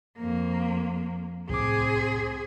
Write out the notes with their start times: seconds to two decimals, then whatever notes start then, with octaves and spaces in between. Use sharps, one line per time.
0.18 F2 A#3
1.50 C2 A2 C4 G#4 D6